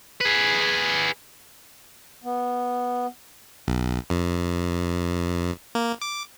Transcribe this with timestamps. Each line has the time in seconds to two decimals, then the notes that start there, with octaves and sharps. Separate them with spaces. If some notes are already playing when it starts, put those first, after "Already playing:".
0.21 G#4 B4
2.24 B3
3.68 B1
4.10 F2
5.75 A#3
6.02 D6